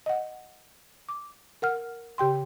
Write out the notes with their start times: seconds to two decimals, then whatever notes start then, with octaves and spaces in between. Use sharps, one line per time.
0.06 D#5 F#5
1.09 D6
1.62 A#4 F#5 F6
2.18 C#3 G4 G5 C6